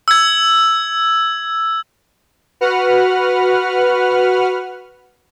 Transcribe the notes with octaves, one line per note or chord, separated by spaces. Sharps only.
E6 G#6
F#4 B4 F#5 F6